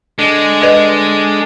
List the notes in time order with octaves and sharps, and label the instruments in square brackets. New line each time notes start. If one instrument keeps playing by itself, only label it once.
[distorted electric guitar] G#3 [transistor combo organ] D4 A4
[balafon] B4 D5 D#5